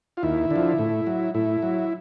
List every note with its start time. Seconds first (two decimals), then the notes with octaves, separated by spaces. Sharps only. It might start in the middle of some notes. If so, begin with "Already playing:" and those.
0.17 F4
0.23 D#2 E4
0.51 D3
0.56 F3
0.79 A2
1.07 F#3
1.34 A2 E4
1.62 F#3